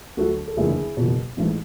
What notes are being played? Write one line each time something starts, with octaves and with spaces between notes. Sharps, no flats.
D2 D3 F#3 A3 F#4 A4
A4
F#1 E2 D3 A3 E4 G#4
F#1 E2 B2
A1 G#2 E3 A3